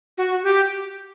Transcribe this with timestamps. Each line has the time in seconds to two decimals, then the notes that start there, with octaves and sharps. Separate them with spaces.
0.18 F#4
0.43 G4